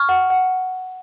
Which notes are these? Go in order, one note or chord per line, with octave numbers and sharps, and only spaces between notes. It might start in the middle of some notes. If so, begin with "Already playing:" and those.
Already playing: C#6 F6
F#5
F#5